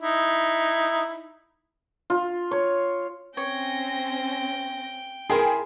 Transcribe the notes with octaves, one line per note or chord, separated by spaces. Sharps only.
D#4 E4
F4
C#5
C4 C#4 C#5 G5 A#6
E4 G#4 A#4 G5 G#5 C6